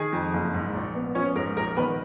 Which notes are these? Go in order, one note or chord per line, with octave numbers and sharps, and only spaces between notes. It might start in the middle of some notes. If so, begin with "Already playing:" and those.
Already playing: D#3 G#4 G#5
F2
F#1
G#2
A#1
B3
F3 C#4 C#5
G#2 A#4
A#1 A#4
D#3 B3 B4